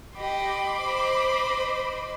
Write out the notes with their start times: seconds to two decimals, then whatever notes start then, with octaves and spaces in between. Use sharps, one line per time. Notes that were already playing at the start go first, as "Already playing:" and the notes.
0.17 G4 D#5 B5 C6 D6
0.77 C5 D#5